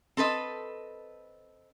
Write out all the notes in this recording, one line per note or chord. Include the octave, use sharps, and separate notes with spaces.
C4 A4 B4 D#5